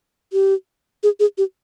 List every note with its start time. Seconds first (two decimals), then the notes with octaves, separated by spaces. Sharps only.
0.33 G4
1.03 G#4
1.20 G#4
1.38 G4